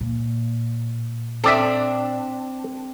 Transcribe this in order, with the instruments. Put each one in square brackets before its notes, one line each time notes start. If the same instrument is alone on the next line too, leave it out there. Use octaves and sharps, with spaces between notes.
[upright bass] A#2
[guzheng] C4 D4 [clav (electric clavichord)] A4 D5 E5